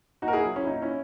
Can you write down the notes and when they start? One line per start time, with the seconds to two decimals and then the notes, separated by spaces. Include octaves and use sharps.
0.22 A#2 D#4 F#4
0.28 A#4
0.33 E4 G#4
0.45 F#3
0.56 C#4 E4
0.67 A#2 D#4
0.82 C#4 E4